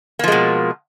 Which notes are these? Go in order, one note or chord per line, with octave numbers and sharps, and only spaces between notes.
B2 F3 G#3 A#3